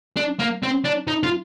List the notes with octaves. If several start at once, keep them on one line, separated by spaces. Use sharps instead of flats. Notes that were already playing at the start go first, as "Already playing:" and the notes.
D4
A#3
C4
D4
D#4
F4